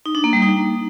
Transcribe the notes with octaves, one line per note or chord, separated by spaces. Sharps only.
D#4
D4
A#3
G3
D#4